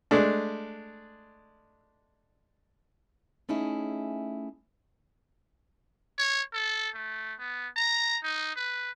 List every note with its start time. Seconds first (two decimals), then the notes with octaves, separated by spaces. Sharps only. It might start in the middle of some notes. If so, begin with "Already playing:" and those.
0.11 G#3 A3 D4
3.49 A3 C#4 D#4 E4 G#4
6.18 C#5
6.54 A4
6.94 A3
7.39 B3
7.76 A#5
8.23 D#4
8.56 B4